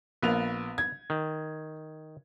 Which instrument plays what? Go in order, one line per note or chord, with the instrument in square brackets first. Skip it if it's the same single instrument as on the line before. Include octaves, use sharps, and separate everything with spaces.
[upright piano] A#1 A#3 F7 [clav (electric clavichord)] B3
[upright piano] G#6
[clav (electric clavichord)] D#3